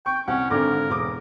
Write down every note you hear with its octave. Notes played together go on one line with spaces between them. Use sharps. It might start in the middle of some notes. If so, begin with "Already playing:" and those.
G5 C#6
C2 C#4 F#5
G#1 D3 A#4 D6
E1 D6 D#6